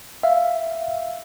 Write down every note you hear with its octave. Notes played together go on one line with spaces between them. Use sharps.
E5 F5